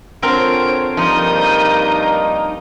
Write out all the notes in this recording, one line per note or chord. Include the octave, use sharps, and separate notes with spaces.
D3 C4 F4 A#4 C5 C#5 D7
G2 F3 A#3 D#4 A#4 D#6 G6